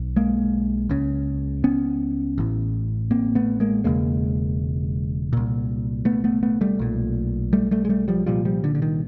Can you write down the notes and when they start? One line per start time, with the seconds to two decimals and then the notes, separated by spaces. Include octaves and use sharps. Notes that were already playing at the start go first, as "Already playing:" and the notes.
Already playing: B1
0.16 G#3 A#3
0.90 C#2 C#3
1.64 B3 C#4
2.38 A1 A2
3.11 A#3 C4
3.35 A3 B3
3.60 G#3 A#3
3.84 E1 E2 C#3 G#3 A#3
5.33 C2 A#2
6.05 A3 B3
6.24 A3 B3
6.43 A3 B3
6.61 G3 A3
6.79 B1 A#2
7.53 G3 A3
7.71 G3 A3
7.85 G#3
7.89 G3 A3
8.08 F3 G3
8.26 C2 A#2 F3 G3
8.45 F3 G3
8.64 D3
8.75 D3
8.82 D#3